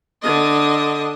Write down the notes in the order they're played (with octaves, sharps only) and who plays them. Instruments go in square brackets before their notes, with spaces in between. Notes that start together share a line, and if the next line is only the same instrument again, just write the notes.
[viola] D3 D#5